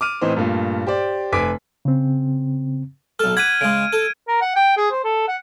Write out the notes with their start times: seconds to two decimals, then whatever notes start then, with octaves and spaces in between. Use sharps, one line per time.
0.01 D6 F6 D#7
0.21 A2 E3 C4 D#4 C5
0.37 G2 A#2 A3
0.87 G4 C5 D5
1.32 F1 B4 G#5 D6 B6 D7
1.85 C#3 C4
3.19 B1 A4 F6
3.37 F#5 B5 D6 G#6 D#7
3.61 C#3 G#3 D7
3.93 A4
4.28 A#4
4.42 F#5
4.56 G5
4.77 G#4
4.91 C5
5.04 A4
5.28 F#5